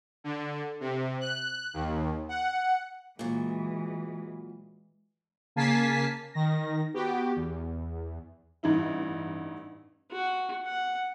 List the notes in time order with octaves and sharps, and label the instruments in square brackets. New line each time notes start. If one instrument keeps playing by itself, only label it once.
[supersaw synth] D3
C3
F#6
D#2
F#5
[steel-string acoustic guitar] A#2 F#3 [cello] E3 G#3
[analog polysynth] C#3 A#3 G#5 A5 B6 C7
D#3 A#6
B3 F#4 G4
E2
[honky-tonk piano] A1 G2 D#4 E4
[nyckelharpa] F#4
F#5